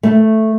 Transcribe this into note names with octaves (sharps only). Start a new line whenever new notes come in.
A3